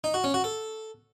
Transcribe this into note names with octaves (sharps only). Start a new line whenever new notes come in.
D#4
F#4
C#4
F#4
A4